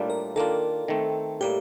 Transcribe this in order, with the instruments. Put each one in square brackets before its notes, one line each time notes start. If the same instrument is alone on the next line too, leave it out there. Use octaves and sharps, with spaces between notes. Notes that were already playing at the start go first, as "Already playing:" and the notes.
Already playing: [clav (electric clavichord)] A2 G3 A#3 D4 F4
[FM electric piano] A#4
[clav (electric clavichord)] D#3 A#3 D4 F4 [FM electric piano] A4
[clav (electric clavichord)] D#3 A3 C4
[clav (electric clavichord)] A2 G3 A#3 [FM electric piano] G4